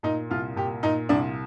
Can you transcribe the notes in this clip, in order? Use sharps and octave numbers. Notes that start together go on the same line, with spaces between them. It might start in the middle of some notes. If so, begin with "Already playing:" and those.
A#2 D#4
C2 F4
A#2 G4
A#2 D#4
C2 D4